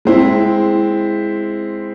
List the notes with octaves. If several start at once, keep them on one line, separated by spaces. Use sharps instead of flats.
G#3 C4 E4